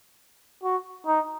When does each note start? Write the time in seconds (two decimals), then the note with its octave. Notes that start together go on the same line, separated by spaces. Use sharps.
0.63 F#4
1.07 D#4